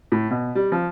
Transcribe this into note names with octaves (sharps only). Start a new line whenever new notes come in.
A2
B2
G3
F3